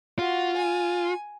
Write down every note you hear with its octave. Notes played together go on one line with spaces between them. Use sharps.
F4 F#4
G#5